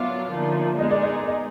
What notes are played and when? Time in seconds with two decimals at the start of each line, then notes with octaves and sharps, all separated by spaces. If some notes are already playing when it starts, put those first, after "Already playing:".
Already playing: B2 F#3 B3 D4 F4 E5
0.31 D3 F3 A#3 D#4
0.79 G#3 B3 D#4 G#4 D#5
0.91 D5
1.02 D#5
1.27 D#5